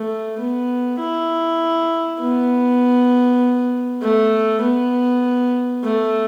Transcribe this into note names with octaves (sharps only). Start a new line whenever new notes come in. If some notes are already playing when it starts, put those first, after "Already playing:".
Already playing: A3
B3
E4
B3
A3
B3
A3